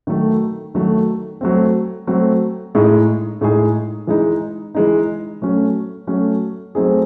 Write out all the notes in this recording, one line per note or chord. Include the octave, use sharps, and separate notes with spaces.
D#3 F#3 A3
D#3 F#3 A3
F#3 A3 C4
F#3 A3 C4
A2 G#3 D#4 G#4
A2 G#3 D#4 G#4
E3 G#3 D#4
E3 G#3 D#4
F#3 A3 C#4
F#3 A3 C#4
F#3 A3 C4 D#4 G#4